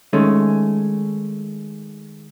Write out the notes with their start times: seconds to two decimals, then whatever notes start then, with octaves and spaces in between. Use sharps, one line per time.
0.13 D#3 G#3 A3 C#4